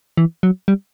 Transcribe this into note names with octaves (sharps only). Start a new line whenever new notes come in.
E3
F#3
G3